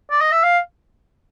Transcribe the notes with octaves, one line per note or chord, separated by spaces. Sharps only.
D5
D#5
E5
F5